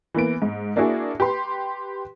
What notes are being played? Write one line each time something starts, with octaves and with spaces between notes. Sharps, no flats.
E3 A#3 B3 D7
G#2
A#3 D4 E4 F#4 G#4
G4 B4 C6